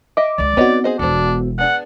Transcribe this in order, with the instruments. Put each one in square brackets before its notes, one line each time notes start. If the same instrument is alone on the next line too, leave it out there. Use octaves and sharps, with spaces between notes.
[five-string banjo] D#5 E5 [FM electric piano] D6
[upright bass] C#2 D3 [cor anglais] D5
[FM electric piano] B3 F#4 [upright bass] C4 D#4 [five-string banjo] B4 C#5 D#5
[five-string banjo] G#4 C5 D#5
[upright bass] E1 E3 [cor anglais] D4 [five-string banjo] A4 C5
[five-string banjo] B3 D4 G#4 [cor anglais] F#5